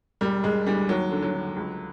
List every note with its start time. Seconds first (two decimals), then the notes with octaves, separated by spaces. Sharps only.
0.21 E1 G3
0.44 E1 G#3
0.66 D2 G3
0.89 D#2 F#3
1.11 D3
1.22 F#3
1.34 D3
1.57 C#2